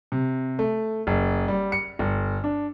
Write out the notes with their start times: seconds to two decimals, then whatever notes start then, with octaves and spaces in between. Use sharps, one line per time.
0.12 C3
0.59 A3
1.07 F#1
1.48 G3
1.72 C#7
1.99 G1
2.44 D4